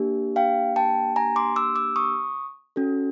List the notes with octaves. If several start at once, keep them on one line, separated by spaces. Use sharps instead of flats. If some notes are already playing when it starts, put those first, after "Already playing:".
Already playing: A#3 D4 G4
F5 G5
G5 A5
G#5 A#5
C6 D6
D6 E6
D6 E6
C#6 D#6
C#4 F#4 A4